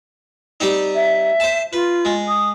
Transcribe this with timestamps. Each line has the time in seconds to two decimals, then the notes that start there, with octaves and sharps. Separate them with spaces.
0.60 G3 C4 D#4
0.95 E5
1.40 C5 A5
1.73 F4 B4
2.05 G#3
2.28 D#6